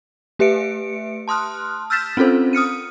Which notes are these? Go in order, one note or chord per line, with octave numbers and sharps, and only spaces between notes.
A3 G4 B4 E5 C#7 D7
A5 C6 D#6 F6 F#6
E6 F6 G6 A6 B6 E7
C4 C#4 F4 A4 C5
D#6 F6 C#7 D#7